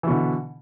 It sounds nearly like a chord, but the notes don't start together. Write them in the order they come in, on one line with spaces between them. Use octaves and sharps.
E3 B2 D3